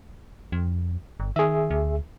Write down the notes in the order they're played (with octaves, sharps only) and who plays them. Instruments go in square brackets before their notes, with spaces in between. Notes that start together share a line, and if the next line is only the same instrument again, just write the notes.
[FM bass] F2
G1
[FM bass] D#3 [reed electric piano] G#4 E5
[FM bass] D2